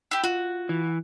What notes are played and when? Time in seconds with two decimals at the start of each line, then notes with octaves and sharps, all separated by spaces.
0.11 E4 G4
0.24 F4 F#4
0.69 E3